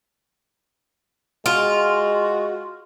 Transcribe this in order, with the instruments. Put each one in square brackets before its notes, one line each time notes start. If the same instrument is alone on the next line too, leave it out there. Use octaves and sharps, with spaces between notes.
[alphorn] G#3 [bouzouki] F4 [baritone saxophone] F#4